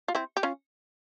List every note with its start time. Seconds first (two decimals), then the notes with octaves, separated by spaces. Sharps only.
0.08 F4
0.15 C4 E4
0.37 G4
0.43 C#4 F4